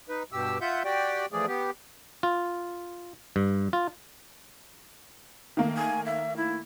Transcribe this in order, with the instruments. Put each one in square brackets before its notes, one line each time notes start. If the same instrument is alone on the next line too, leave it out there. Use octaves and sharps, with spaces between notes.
[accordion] D#4 B4
G2 B2 G4 E6
F4 E5 F#5 G6
F#4 G4 D5 G5
E3 F3 A3 G#4 D5
B3 G4
[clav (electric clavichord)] F4
G2
F4
[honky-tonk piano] D#3 A3 A#3
[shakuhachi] G#5
E5
E4